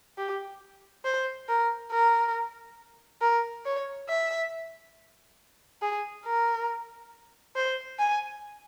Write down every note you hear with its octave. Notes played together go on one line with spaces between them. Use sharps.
G4
C5
A#4
A#4
A#4
C#5
E5
G#4
A#4
C5
G#5